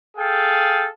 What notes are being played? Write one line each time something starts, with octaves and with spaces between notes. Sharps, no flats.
G#4 A4 F5 G5